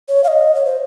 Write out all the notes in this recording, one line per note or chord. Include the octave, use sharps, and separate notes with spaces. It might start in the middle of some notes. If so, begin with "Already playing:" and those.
C#5
F5
D#5
C#5
C5